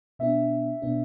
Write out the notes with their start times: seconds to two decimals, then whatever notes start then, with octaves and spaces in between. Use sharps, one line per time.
0.19 B2 B3 D4 E5
0.82 B2 B3 D4